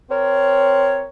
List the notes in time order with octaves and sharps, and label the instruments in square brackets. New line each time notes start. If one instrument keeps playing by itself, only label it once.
[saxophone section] C4 A#4 C#5